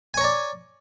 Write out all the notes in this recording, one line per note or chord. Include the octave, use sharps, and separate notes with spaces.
C#5 D5 G#5 A#5